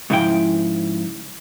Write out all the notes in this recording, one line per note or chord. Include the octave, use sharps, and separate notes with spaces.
G#2 C#3 F3 E4 G5